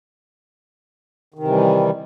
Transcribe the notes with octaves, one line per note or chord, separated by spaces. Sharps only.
C3 D#3 E3 G3